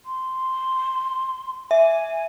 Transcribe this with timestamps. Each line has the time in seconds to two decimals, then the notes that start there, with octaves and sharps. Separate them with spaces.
0.06 C6
1.71 E5 G#5